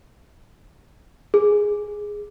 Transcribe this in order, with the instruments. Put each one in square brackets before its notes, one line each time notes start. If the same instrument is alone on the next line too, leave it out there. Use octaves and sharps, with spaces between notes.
[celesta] G#4